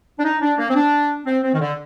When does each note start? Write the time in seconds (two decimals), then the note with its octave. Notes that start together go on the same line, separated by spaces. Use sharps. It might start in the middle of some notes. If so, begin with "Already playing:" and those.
0.19 D4
0.24 D#4
0.41 D4
0.58 A#3
0.70 C4
0.75 D4
1.26 C4
1.43 C4
1.54 D#3
1.60 D3